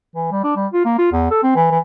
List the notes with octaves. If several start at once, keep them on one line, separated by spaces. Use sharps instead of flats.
E3
G3
D4
G3
F4
A#3
F4
E2
A4
C4
E3
E3